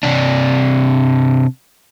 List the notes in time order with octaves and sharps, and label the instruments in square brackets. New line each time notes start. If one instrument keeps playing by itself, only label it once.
[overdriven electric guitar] C3 D4